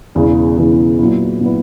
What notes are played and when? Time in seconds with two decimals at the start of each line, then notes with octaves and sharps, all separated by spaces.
0.15 E1 E2 C#3 E3
0.58 E1 E2 C#3 E3
0.99 A#2 F#3 B3 E4
1.41 A#2 F#3 B3 E4